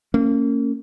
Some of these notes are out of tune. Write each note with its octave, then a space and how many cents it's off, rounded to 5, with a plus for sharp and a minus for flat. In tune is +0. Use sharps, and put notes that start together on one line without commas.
A#3 -35 C#4 -5